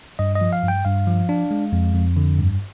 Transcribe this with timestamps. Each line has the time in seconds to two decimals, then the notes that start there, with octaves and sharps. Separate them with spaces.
0.19 G2 D#5
0.36 D#5
0.41 F3
0.53 F5
0.63 G2
0.68 G5
0.85 G2 F5
1.07 F3
1.29 D4
1.51 G#3
1.73 F2
1.95 F2
2.16 D3
2.38 G2